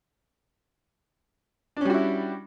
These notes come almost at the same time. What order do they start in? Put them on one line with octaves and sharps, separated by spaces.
D4 C#4 G3 F#4 E4